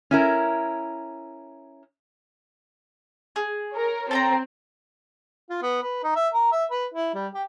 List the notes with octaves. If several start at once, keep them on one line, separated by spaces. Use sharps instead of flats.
C#4 E4 A#4
G#4
A#4 C#5
C4 A4 G5 A#5
F4
B3
B4
D#4
E5
A#4
E5
B4
E4
G3
G4